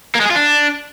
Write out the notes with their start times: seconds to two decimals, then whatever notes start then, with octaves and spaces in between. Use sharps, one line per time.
0.15 A#3
0.20 G#3
0.25 G#4
0.31 F4
0.36 D4